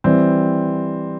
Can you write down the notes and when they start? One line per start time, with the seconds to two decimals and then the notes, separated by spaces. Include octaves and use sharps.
0.04 E3 G3 C4